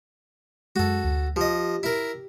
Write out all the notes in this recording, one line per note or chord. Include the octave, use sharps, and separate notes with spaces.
F#2 G#3 F#4 A4
D2
F3 G4 D#5
E4 A#4